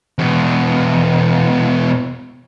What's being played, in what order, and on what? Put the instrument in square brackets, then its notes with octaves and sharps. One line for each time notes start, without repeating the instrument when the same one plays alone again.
[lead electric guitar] E2 B2